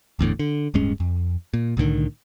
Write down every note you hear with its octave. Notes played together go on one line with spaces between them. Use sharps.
G1 E2 A2 D3
D3
D1 G2 G#3 C#4
F2
A#2
C2 A2 D3 D#3